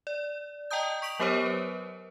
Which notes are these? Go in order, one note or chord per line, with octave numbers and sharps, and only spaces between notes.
D5
D#5 G5 A5 A#5 D#6 G6
C#6 B6 D7 F7 F#7
F#3 B3 G4 A#4 C5 C#5
B4